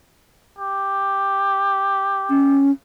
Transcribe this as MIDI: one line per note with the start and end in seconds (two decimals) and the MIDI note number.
0.59 2.65 67
2.30 2.71 61